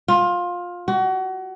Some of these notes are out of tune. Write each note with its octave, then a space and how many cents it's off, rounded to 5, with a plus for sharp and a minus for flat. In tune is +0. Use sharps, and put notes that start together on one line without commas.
F4 +20
F#4 +30